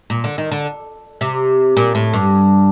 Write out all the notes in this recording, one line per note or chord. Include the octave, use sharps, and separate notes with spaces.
A#2
D3
D#3
D3
C3
A#2
A2
G2